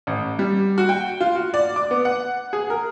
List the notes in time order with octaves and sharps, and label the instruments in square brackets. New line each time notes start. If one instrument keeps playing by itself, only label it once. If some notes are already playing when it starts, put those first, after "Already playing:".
[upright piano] A1
G3
F#4
G5
F4
F#4
D5
D6
B3
F#5
G#4
A#4